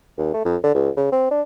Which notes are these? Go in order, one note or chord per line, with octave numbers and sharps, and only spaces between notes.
D#2
A3
F2
D3
C#2
C#3
C4
D4